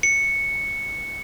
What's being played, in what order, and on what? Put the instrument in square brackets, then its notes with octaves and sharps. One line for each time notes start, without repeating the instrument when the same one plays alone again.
[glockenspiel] C#7